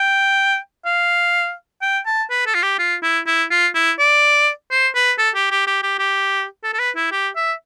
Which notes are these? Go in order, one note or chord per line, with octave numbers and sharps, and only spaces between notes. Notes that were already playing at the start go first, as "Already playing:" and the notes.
Already playing: G5
F5
G5
A5
B4
A4
F4
G4
F4
E4
E4
F4
E4
D5
C5
B4
A4
G4
G4
G4
G4
G4
A4
A4
B4
E4
G4
E5